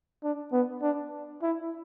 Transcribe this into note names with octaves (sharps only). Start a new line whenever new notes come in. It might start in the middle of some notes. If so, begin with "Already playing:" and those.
D4
B3
D4
E4